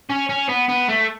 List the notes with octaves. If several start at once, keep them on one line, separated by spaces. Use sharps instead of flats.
C#4
C#4
B3
B3
A3